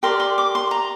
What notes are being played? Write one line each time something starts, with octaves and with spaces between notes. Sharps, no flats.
G4 A#4 D5 C6
C6
D6
C6
A#5